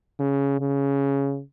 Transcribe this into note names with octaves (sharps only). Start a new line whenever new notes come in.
C#3
C#3